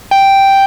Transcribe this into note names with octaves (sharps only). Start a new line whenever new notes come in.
G5